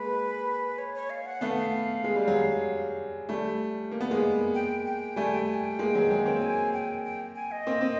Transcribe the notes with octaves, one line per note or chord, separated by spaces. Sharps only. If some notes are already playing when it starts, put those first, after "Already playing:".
Already playing: G#3 A#3 B4
C#5
C#5
F5
F#5
A3 B3 F5
G#3
G3
F#3 G#3
G3 A3
A#3
B3
G#3 A#3
G5
G5
G3 A3 G#5
G5
G#5
G5
G#3 A#3
F#3 G#3
F#3 G#3
A#3 C4
G#5
G5
G5
G#5
D#5
A#3 C4
C4